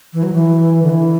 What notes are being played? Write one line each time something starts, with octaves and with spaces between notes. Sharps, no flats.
E3
F#3
E3
D3
E3